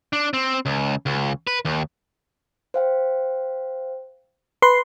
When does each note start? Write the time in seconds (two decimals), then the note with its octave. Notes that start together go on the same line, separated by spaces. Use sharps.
0.13 D4
0.34 C4
0.66 C#2
1.06 C#2
1.47 B4
1.65 D#2
2.74 C5 F5 G5
4.62 B4 C6 C7